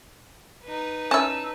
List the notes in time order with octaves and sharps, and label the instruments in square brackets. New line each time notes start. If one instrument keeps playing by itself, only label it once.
[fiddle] D#4 B4
[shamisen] C#4 E4 [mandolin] A5 E6